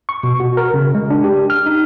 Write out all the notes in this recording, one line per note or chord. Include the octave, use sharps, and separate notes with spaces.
C#6
B2
F#4
A#4
C#3
G#3
D4
G4
F6
D#4